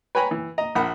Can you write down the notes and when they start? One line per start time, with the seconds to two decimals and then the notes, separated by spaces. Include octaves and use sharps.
0.15 B4 C#5 G5 G#5 A#5 B5
0.31 E3
0.58 D#5 A#5
0.75 A#1 A#4 F#5 B5